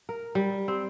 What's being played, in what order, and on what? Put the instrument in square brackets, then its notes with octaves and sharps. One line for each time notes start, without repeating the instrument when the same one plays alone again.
[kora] A#4
G3
C4